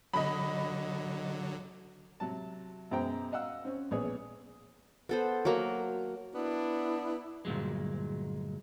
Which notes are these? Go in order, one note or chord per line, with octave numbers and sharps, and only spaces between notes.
D3 F#3 D#5 B5
C3 F#3 A5
F#2 B2 G#3 C5 G5 A#5
D#5 F5 F#5 E6
C4 C#4
A#1 B3 G#4 C#5
B3 A4 C5
F#3 A#3 A#4
B3 D4 E4
D2 G2 A#2 F#3 G#3